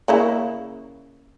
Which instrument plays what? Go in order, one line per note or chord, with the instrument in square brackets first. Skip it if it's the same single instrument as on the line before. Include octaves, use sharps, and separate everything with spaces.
[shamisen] C#3 A#3 E4